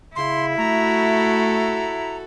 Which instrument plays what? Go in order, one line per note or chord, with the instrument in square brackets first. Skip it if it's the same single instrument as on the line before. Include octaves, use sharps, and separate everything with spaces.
[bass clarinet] C#3 [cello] E4 [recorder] C6
[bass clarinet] A3 [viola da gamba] F#4 A4 [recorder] A#5